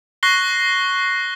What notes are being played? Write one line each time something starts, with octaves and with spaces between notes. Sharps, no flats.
C#6 F#6 A#6 C7 G7